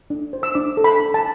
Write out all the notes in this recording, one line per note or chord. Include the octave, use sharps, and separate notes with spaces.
D4
C5
E6
D4 D6
A4
B5
D4
A5